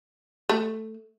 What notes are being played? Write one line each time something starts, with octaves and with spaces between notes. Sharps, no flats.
A3